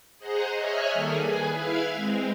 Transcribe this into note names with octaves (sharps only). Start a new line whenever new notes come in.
G#4 C5 D#5 F#5 A#5
C#5 D#5 E5 G#5 F6 F#6
D#3 G3 A#3 G#4 A4
G#4 B4 G#5
E4 B4 F5 F6 G#6
G#3 C4